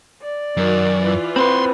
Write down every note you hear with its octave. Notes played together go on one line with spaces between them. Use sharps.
D5
F#2 D#3 F#4
E3 F4
C4 B4 B5 C6